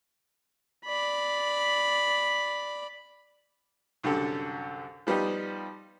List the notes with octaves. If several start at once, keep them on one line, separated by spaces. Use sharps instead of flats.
D5 B5
C2 F#2 D3 G4 A4
F3 G3 B3 D#4 G4